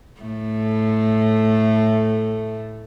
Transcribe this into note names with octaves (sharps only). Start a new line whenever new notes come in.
A2 A3